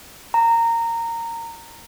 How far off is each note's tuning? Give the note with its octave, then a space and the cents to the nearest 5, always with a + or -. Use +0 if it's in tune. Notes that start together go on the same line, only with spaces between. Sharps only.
A#5 -15